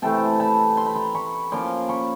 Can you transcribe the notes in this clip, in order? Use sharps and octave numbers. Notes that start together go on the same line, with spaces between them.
C3 E3 A3 G5 A5
A5 B5
C6
B5
A#5 C6
B5 C#6
F3 A#3 C#4 F4 C6 D6
B5 C#6